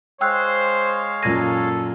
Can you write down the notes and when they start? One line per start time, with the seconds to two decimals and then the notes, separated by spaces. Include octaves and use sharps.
0.21 G#3 C5 C#5 F5 G5 E6 F#6
1.23 F#2 A#2 A4 G#6 A#6 D#7